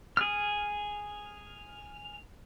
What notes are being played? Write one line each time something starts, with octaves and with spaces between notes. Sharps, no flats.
G#4 F6